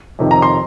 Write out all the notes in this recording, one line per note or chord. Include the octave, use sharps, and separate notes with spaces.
F2 C3 D#3
A#5
C6